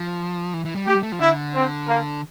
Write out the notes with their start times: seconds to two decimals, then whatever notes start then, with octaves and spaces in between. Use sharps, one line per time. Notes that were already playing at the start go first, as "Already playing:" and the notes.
Already playing: F3
0.54 E3
0.65 E3
0.76 G3
0.86 A3 G4
0.95 G3
1.03 A3
1.12 F3
1.19 D3 E4
1.53 C4
1.87 A#3